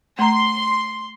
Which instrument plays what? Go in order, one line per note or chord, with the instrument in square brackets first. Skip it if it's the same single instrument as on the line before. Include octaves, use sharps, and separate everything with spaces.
[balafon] A3 A#5 [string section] C6